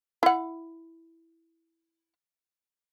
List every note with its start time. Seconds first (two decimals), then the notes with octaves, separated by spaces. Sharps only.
0.23 E4 F#5